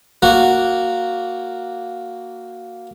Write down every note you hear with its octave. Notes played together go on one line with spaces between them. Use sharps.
A#3 F#4